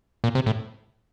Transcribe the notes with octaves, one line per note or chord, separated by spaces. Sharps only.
A#2
C3
A2